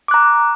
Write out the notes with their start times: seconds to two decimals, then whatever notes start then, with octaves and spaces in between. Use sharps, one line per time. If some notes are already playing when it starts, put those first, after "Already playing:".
0.08 D6
0.11 F#6
0.14 A#5